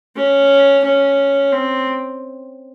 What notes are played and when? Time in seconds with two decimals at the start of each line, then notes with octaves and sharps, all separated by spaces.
0.16 C#4
0.84 C#4
1.52 C4